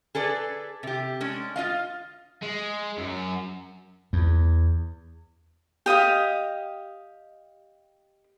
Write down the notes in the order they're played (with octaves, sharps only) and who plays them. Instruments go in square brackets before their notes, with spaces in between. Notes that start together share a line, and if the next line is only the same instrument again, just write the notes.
[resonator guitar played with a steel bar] G#4 A4 B4 D5
C3 G4
G#3 C#4 D4
F4 D#5 F5
[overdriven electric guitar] G#3
F#2
[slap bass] E2
[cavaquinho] G4 D#5 F5 D#6